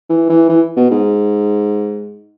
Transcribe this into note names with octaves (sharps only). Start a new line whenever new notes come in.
E3
E3
E3
B2
G#2